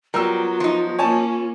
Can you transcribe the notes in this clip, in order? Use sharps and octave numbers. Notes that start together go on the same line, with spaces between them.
F#3 G3 B3 F4 A#4 E6
F3 D#4
A#3 C#4 C#5 G#5 A5